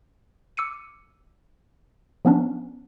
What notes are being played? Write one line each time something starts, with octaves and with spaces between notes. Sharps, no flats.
D6 E6 C#7 D#7
F3 B3 C#4 D4